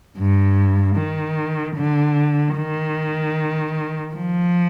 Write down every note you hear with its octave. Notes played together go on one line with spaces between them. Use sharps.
G2
D#3
D3
D#3
F3